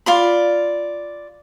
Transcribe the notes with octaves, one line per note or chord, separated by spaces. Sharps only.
F4 D5 B5